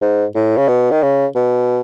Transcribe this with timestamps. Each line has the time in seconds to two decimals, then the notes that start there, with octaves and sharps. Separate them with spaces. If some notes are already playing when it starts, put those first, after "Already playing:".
0.02 G#2
0.35 A2
0.57 C#3
0.68 B2
0.91 D#3
1.03 C#3
1.36 B2